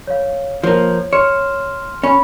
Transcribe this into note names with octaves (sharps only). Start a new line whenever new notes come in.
C#5 F5
F3 A#3 C#5
C#5 C6 F6 E7
C#4 B5 C#6